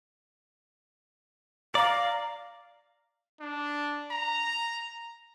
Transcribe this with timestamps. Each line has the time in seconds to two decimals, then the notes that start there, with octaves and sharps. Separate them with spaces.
1.75 D5 F5 A#5
3.40 D4
4.11 A#5